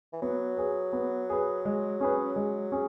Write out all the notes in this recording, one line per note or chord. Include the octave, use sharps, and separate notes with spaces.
E3
F#3 B3
G#4 B4
B3
G#4 B4
G#3
C#4 G#4 B4
G#3
C#4 G#4